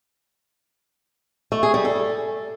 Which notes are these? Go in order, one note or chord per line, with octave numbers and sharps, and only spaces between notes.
A3
G#4
G3
A4